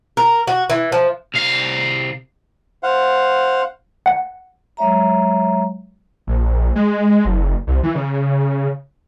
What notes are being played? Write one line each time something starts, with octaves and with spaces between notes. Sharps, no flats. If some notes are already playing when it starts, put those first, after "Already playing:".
A#4
F#4
E3
F3
C2 F5
C5 F5 F#5
F#5
F#3 G#3 C#5 E5 A#5
A#1
G#3
F#1
C2
E3
C#3